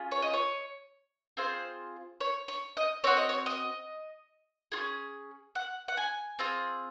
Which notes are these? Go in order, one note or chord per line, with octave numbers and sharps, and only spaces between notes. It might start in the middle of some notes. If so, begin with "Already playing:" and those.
Already playing: C#4 F4 G#4
C#5
D#5
C#5
C4 F4 G#4 C5
C#5
C#5
D#5
C4 F#4 C#5
D#5
C#5
D#5
C#4 F4 G#4
F#5
F#5
G#5
C4 F4 G#4